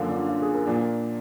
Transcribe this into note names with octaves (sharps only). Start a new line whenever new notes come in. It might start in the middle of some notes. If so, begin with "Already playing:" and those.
Already playing: F#2 D3 F3 A#3 F4
D4
F4
G#4
A#4
A#2 F3 A#3 D4